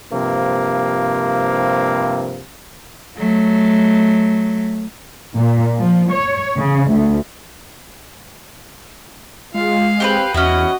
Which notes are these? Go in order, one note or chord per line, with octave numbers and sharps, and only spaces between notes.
G2 C3 F3 A#3
F#3 A3
A#2
F3
C#5
C#3
D2
G#3 F4 F5
C4 G4 A4 B4
E2 C#4 E4 F#4 D#5